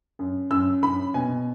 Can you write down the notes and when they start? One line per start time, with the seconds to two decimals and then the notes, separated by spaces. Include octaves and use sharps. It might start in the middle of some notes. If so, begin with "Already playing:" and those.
0.19 F#2
0.51 F#2 E6
0.83 F#2 B5
1.14 B2 G#5